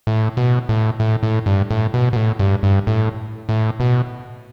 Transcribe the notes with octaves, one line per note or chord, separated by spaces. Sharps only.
A2
B2
A2
A2
A2
G2
A2
B2
B2
A2
G2
G2
A2
A2
B2